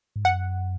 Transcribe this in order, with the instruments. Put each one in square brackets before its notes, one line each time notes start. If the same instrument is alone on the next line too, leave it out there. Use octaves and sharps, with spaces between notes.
[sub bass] G#2
[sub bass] F#2 [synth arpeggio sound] F#5